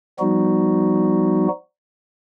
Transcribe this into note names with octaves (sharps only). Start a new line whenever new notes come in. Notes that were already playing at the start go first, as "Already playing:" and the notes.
F3 G3 B3 D#4 F#4